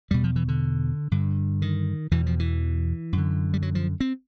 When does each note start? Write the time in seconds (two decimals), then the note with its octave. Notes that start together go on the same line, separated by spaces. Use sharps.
0.11 E2 B2 G3
0.24 F3
0.36 E3
0.48 D3
1.11 G2 D3
1.62 D#3
2.11 E2 B2 E3
2.26 F3
2.40 E3
3.13 F#2 D3
3.54 G3
3.62 F#3
3.75 F3
4.00 C4